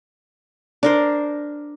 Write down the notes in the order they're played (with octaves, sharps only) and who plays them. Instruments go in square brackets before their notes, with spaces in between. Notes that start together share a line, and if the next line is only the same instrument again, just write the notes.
[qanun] D4 A#4 C5